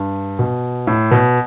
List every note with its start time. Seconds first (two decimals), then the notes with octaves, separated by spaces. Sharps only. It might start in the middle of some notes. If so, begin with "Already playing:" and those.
Already playing: G2
0.39 B2
0.87 A2
1.11 B2